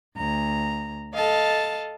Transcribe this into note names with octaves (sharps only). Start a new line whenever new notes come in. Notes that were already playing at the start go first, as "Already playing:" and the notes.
D2 A#5
A4 D#5 F5 A5